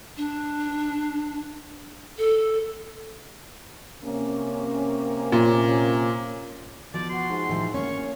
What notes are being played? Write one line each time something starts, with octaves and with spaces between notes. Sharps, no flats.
D4
A4
C3 A#3 C#4
A#2
B2 F3 D5
F#4 C6
G#2
A2 F3
D1 A#3 C#4 C#5 C#6